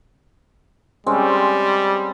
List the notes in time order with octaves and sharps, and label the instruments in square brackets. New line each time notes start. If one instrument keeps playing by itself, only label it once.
[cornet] G3 [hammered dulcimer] G#3 C4 C#4